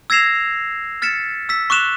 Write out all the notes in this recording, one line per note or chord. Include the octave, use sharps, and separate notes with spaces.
E6 G#6 A#6 C7 E7 F7
F6 A6 B6 C#7 E7
E6 B6
C#6 D6 F#6 E7 F7